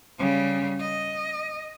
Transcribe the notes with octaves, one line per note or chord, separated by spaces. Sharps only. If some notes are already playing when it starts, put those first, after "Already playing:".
C#3 G3
D#5